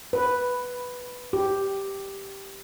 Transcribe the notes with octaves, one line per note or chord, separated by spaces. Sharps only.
B4
G4